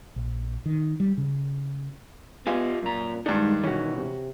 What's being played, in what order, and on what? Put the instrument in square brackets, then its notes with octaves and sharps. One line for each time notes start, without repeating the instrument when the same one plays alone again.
[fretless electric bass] A#1
D#3
G3
C#3
[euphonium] B3 [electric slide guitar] F4 G4 D#5 [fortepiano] F5 G#5
[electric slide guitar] F#2 A#5 [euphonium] A#2
[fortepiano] G2 D4 [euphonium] D#3 [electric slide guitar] G#3 D#4
[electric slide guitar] B2 E3 [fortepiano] C#4 F#4
[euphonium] C3